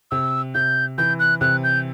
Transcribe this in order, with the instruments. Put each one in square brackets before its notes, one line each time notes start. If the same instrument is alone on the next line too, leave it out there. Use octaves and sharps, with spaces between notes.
[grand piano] C3 [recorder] E6
[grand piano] C3 [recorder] G6
[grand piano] E3 [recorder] G6
[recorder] F#6
[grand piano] C3 [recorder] F#6
[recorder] G6